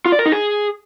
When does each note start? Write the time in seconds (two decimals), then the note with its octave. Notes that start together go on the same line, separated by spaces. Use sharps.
0.06 F4
0.12 D5
0.19 A#4
0.26 D#4
0.32 G#4